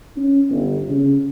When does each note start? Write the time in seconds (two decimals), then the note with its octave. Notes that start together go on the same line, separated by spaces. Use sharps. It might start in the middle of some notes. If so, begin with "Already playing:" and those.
0.17 C#4
0.50 G1
0.89 C#3